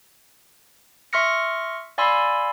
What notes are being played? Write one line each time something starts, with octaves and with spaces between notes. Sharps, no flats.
E5 C6 C#6 F6 A#6 C#7
D5 F5 G#5 B5 C6 E6